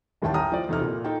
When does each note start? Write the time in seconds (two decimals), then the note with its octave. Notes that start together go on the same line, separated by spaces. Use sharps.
0.22 D#1 A1 D#2 E5 G5 A5
0.34 E5 G5 G#5 A#5 D#6 F6
0.52 F3 D5
0.69 E2 C3 D#4 A4 F6
0.81 A#2
1.04 D#4 A4 G5